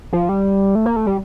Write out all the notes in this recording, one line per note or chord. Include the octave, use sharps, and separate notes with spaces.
F3
G3
A3
A#3
A3
G3